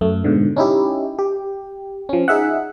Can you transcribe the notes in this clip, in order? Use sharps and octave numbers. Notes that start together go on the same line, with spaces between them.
F#2 A3
G#2 B2 D3
C#4 D#4 E4 G4
G4
F3 C#4
D#4 G#4 E5 F#5